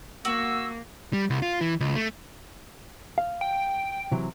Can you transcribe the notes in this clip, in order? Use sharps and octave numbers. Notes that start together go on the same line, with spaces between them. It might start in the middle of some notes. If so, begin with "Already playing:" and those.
A#3 F#4 E6
G3
C2
F4
E3
C#2
A3
F5
G5
C3 E3 F#3